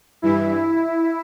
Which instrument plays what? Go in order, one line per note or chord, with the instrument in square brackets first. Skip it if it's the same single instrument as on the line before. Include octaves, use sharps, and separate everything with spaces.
[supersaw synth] G2 E3 E4